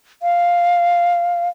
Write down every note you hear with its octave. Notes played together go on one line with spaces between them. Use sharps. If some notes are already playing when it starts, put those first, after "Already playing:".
F5